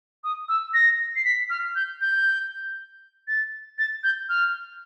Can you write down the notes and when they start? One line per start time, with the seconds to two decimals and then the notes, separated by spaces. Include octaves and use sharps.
0.24 D#6
0.49 E6
0.74 A#6
1.16 C7
1.25 B6
1.50 F6
1.75 G6
2.01 G6
3.28 A6
3.79 A6
4.04 G6
4.29 F6